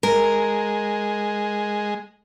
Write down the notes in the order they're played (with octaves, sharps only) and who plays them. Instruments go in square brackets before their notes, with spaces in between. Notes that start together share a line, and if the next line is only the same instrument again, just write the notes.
[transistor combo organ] G#3 [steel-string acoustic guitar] A#4